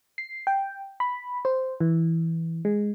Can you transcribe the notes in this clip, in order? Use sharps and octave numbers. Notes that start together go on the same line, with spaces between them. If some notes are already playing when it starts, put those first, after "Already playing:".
C7
G5
B5
C5
E3
G#3